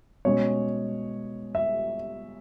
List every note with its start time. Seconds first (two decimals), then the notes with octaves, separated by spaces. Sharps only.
0.25 B2 G#3 C#4 C#5
1.55 E5